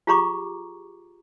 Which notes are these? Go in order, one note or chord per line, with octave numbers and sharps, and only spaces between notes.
F4 G4 G#4 A#5 C#6 D6